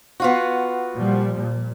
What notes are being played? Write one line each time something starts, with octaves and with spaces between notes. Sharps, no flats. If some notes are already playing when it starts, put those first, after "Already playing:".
B3 F4 F#4
A#2 F3 G3
A#2